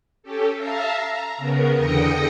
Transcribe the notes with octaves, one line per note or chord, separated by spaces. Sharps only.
C#4 G4 A4
E5 F5 A5 A#5
A#5
C#3 B3 A#4
E2 D3 G5 D#6 A#6 C#7